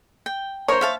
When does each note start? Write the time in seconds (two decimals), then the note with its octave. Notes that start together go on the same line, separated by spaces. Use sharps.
0.26 G5
0.68 A#4 C5 C#5
0.81 E5 F5 A5